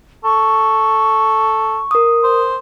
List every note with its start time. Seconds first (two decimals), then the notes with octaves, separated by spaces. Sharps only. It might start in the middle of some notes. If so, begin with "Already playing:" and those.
0.24 A4 C#6
1.91 A#4 D#6
2.24 C5